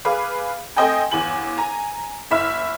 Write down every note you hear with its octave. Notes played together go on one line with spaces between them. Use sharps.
G#4 B4 F5 D6
A3 C4 D#5 G5 G#5
G1 E2 E3 G#5 F#7
G#5 A#5
F#1 E4 E5 B5 F6